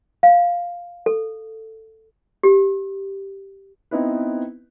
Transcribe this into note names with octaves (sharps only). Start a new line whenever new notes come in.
F5
A4
G4
B3 C4 D#4 E4 B4